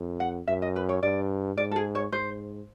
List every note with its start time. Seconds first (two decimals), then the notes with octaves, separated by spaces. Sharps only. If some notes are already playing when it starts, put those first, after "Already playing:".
Already playing: F2
0.20 F#5
0.48 F#2 E5
0.62 D#5
0.76 B4
0.89 C#5
1.03 G2 D5
1.57 G#2 D5
1.71 A4
1.76 G#4
1.95 C#5
2.12 G#2 C5